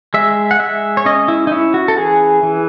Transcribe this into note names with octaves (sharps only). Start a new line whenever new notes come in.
G#3 E5
F#5
G#3 E5
C#5
C#4 D#5
E4
D#4
C#4 E4
F#4
A4
E3 G#4
E3